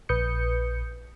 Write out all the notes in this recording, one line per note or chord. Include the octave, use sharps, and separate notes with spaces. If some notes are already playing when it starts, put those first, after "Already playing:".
A#1 B4 D#6 G6 C#7